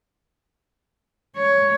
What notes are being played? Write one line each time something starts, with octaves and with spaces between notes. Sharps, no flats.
C#5